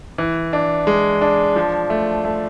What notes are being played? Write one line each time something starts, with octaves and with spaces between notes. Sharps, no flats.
E3
D4
G#3
D4
F3
A3
A3